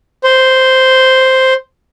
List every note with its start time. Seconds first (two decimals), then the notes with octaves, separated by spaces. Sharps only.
0.24 C5